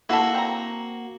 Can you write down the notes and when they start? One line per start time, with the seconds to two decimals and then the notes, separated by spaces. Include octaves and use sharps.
0.09 A#3 E4 F#4 A4
0.35 C4 A#5